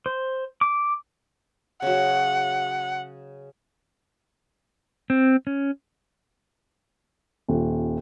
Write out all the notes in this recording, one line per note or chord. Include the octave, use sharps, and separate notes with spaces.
C5
D6
C#3 F#3 F#5
C4
C#4
D#1